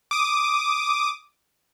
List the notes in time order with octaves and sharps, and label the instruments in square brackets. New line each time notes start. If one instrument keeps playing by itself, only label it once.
[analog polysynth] D6 D#6